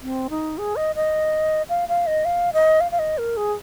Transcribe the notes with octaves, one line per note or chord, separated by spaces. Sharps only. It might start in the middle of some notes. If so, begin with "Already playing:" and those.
C4
D#4
G#4
D#5
D#5
F5
F5
D#5
F5
D#5
F5
F5
D#5
A#4
G#4